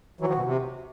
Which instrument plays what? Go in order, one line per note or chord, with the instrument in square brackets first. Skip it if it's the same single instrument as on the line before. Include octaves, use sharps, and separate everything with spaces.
[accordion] E3 F#3 [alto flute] F#4
[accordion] D#3 F3
B2
C3